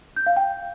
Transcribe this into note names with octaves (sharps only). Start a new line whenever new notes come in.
G6
F5
G5